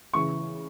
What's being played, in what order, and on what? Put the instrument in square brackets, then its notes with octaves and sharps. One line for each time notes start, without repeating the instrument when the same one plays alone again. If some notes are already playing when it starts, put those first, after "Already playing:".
[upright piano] C#3 E3 C#6